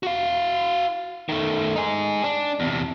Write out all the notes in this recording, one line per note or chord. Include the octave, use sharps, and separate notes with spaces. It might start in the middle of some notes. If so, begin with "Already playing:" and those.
F#4 F5
D#3 A3
D#4 G#4
D4
E2 C3